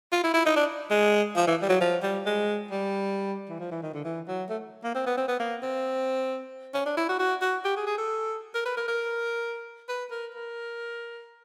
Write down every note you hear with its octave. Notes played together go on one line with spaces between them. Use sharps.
F4
E4
E4
D#4
D4
G#3
F3
E3
G3
F#3
F3
G3
G#3
G3
E3
F3
E3
D#3
D3
E3
F#3
A3
A#3
C4
B3
C4
B3
A#3
C4
C#4
D4
E4
F#4
F#4
F#4
G4
G#4
G#4
A4
A#4
B4
A#4
A#4
B4
A#4
A#4